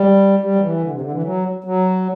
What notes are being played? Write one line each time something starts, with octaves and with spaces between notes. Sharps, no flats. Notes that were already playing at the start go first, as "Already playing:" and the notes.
Already playing: G3
G3
F#3
E3
D3
C3
D3
E3
F#3
F#3